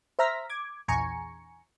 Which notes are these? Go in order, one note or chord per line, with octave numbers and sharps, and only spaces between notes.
C5 E5 A#5 F6 A#6 B6
D6 G#6
A#1 E2 G#5 A#5 C#6 C#7